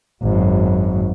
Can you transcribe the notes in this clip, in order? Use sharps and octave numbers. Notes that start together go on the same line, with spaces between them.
G#1 F#2